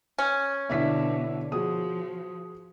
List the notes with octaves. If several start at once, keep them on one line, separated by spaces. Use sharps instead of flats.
C#4
B2 D3 E4 E5 B6
F3 F#4 G#4 D#6